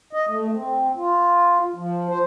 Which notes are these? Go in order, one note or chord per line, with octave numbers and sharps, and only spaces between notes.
D#5
A3
C4
F4
F3
C5